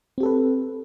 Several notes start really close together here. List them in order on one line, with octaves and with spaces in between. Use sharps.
C4 G4 A4 B4